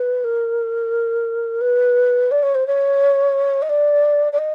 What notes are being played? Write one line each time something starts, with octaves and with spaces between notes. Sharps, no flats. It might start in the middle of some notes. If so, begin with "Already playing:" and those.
Already playing: B4
A#4
B4
D5
C#5
C5
C#5
D#5
D5
D5
D#5